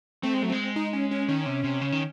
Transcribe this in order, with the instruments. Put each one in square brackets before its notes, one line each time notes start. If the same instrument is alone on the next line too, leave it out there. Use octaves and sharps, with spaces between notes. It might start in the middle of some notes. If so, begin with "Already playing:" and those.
[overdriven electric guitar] A3 [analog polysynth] C4
[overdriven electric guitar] G#3
[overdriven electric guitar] F#3 [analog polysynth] A3
[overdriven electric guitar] G#3 [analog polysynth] C4
[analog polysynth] D#4
C#4
C#4
[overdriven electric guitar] D#3 [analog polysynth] C#4
[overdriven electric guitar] C3
C3
C#3
D#3